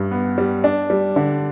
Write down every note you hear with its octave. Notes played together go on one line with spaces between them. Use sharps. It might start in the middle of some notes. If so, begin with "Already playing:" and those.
Already playing: G2 G4
B3
G3
D4
G3
D3